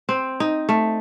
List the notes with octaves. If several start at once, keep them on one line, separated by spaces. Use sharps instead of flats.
C4
D#4
A3